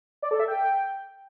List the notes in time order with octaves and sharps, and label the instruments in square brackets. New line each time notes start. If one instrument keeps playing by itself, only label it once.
[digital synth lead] D5
A4
E5
G5